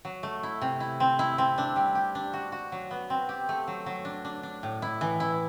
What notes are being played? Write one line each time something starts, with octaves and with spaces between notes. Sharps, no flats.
F#3
A3
E4
C3
E4
C4
E4
C4
D4
G3
G4
D4
F#4
F#4
F#3
B3
C4
G4
A3
F#3
F#3
D4
D4
D4
A2
E4
E3
E4